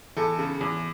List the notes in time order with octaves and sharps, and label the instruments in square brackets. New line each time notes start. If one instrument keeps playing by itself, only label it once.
[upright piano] E2 A4
C#3
E2